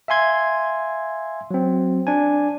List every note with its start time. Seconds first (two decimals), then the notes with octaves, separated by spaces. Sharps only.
0.08 E5 F5 G#5 C6 G#6
1.51 F#3 C4
2.07 D4 G#5